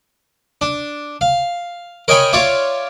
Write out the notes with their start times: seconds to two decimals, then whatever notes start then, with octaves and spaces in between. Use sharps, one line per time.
0.61 D4
1.21 F5
2.08 A#4 C#5 D#5 G5 G#5 B5
2.33 F4 C#5 D5 E5